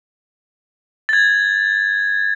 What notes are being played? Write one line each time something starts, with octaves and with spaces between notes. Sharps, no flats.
G#6 A6